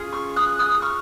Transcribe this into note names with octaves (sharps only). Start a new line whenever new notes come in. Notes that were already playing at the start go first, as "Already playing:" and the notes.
Already playing: C#4 F4 G#4
C#6 F6
D#6 F#6
D#6 F#6
F#6
C#6 F6